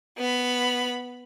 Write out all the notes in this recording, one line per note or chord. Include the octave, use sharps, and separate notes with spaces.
B3 B5